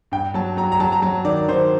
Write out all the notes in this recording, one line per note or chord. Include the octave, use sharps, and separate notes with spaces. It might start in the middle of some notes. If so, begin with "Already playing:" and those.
G2 G5
F#3 A5
F#3 A#5
A#5
F#3 A5
A#5
F#3 A5
D#3 D5
D#3 C5